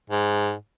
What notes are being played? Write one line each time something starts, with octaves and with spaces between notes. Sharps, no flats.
G#2